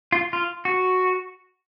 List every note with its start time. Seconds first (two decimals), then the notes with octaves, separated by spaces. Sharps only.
0.12 F4
0.33 F4
0.65 F#4